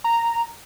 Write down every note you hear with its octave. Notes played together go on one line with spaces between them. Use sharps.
A#5